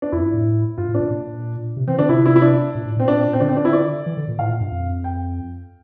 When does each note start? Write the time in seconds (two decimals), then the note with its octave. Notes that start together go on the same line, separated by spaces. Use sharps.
0.02 D4
0.12 F2 E4
0.23 G2
0.34 A2
0.78 G2 F4
0.89 A2
0.94 D4
1.00 A#2
1.11 A#2
1.77 C3
1.87 E3 C4
1.98 D3 D4
2.09 C3 E4
2.26 E4
2.36 E4
2.42 D4
2.75 A#2
2.85 A2
2.97 A#2 C4
3.08 D4
3.33 C4
3.40 D3 D4
3.48 C4
3.57 D4
3.65 E4
3.73 D5
4.06 E3
4.17 D3
4.28 A#2
4.39 A2 F5
4.49 A#2
4.60 G2
4.72 F2
5.04 G5